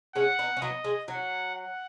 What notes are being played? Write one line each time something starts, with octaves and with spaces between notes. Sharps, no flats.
G#3 C#4 F#5
B3 D#4
C#4
F#3 B3 D#5
G#3
F#3 F#5
F#5